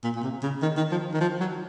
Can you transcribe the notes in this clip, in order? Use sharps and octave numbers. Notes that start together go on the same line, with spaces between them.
A#2
A#2
C3
C#3
D#3
D#3
F3
D#3
F3
F#3